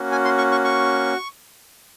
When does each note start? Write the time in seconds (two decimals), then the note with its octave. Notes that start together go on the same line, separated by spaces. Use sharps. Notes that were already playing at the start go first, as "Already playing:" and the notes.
Already playing: A#3 C#4 F#4
0.12 G#5
0.25 C6
0.38 C#6
0.52 C#6
0.64 C#6